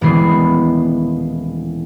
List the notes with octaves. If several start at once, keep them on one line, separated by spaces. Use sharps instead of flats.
D#1 B2 E3 G#3 B3 C7